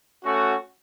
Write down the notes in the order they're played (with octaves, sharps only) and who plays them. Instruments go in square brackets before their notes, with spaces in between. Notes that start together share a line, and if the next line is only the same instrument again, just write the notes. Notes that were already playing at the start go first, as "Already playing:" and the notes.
[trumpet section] A3 C#4 F#4